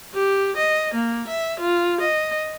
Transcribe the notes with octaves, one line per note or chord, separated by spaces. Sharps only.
G4
D#5
A#3
E5
F4
D#5